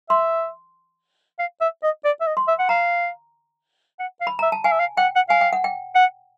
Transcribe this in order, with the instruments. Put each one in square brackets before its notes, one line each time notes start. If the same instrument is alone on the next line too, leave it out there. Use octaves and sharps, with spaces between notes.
[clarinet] E5 [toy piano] C6
[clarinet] F5
E5
D#5
D5
E5
D#5
[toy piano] C6
[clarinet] E5
F#5
[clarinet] F5 [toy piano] A#5
[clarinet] F#5
F5
[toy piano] B5
[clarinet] E5 [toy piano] A#5
[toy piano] A5
[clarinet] F5 [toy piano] G#5
[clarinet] E5
F5
[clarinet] F#5 [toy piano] G5
[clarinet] F#5
[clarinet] F5 [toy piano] G#5
[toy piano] G5
F#5
G5
[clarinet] F#5